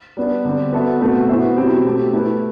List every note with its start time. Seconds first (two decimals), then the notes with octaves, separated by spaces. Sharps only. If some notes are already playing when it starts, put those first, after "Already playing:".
0.17 G3 B3 D4
0.45 D3 G3 C4
0.72 B3 F#4 A4 E5
1.01 B2 A3 C4 F#4 B4
1.29 E3 B3 F#4 C5 E5
1.56 B2 F#3 C4 E4 G4
1.85 B2 A3 C4 G4
2.13 A3 E4 B4